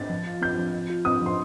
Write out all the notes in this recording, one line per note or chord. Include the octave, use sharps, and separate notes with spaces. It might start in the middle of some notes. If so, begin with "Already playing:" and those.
Already playing: A6
F3
F4
C4 G6
F3
F3
F4
C4 D#6
F3 C6